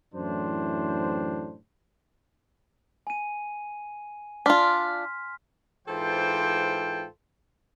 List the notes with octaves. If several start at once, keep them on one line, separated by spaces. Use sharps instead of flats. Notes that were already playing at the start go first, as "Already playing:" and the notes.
F#2 A2 E3 D4 C5
G#5 D#7
D4 F4 C6 F6 B6
G#2 E3 F4 A4 C5 G5